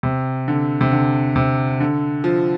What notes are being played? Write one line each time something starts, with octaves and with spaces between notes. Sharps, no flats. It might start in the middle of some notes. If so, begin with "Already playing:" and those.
C3
D3
C3
D3
C3
D3
F3